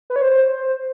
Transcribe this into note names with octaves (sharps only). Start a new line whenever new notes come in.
B4
C#5
C5